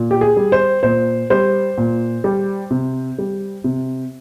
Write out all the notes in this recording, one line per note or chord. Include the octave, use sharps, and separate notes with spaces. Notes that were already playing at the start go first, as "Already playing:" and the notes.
Already playing: A#2
G4
G#4
G3
C5
A#2 C5
G3 C5
A#2
G3
C3
G3
C3